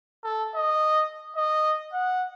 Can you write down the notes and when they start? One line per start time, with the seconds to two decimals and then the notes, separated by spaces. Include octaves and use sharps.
0.24 A4
0.55 D#5
1.36 D#5
1.93 F#5